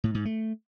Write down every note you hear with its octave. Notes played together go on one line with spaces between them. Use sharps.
A2
G#2
A3